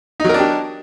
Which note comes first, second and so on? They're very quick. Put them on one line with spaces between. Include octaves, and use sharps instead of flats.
D#4 F#3 A#4 D4 G4